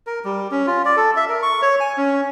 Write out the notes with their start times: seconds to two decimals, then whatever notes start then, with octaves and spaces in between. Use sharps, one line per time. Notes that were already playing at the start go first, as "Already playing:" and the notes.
0.07 A#4
0.25 G3
0.51 C#4
0.67 F4
0.85 D5
0.97 A4
1.17 E5
1.29 A#4
1.42 C#6
1.62 C#5
1.80 G#5
1.97 C#4